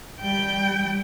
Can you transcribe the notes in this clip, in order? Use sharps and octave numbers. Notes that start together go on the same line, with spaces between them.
G3 G5